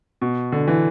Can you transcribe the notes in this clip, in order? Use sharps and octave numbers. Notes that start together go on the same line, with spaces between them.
B2
D3
E3